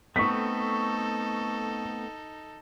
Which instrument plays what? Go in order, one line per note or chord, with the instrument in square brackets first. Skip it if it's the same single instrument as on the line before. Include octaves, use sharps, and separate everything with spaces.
[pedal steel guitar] A3 B3 C4 [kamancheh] D#4 A4 [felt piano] C#6 B6